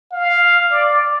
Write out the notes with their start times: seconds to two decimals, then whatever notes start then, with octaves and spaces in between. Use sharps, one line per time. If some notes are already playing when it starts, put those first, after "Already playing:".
0.12 F5
0.71 D5